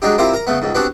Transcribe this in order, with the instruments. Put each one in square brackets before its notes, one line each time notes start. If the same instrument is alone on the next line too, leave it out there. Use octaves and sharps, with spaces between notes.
[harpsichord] F#3 G#3 D4 D#4 G4
C4 E4 F4 G4 A#4 C5
A#4 A#5
C#3 A3 B3
C#2 G#2
B3 C4 D4 F#4 G4